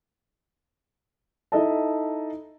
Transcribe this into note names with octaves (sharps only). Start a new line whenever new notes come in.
D#4 E4 A4 D#5 E5 A5